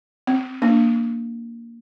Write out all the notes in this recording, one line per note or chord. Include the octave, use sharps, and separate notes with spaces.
C4
A#3 D4